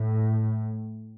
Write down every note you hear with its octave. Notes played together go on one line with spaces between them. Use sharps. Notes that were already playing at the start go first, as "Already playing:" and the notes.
Already playing: A2